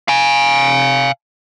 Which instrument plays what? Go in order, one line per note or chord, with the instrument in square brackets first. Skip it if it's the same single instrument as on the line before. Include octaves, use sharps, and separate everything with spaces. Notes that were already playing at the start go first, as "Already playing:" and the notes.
[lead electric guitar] F5 G#5